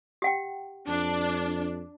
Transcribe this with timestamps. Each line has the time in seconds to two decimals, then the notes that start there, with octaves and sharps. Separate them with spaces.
0.22 G4 F#5 G5
0.88 F2 D4